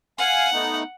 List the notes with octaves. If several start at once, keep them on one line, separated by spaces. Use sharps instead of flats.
F5 F#5 G#5
A3 B3 D#4